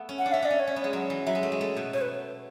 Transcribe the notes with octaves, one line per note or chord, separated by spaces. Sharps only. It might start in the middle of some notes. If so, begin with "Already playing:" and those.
Already playing: A3 B3
C#4
F#5
D4
C#4 E5
D4 D5
C#4
C#5
C#4
B3
G#3
F#3
E3
F#3 E5
G#3
A3
G#3
A3
B2
B2 C#5
B4